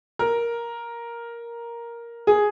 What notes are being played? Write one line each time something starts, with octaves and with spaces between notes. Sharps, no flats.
A#4
G#4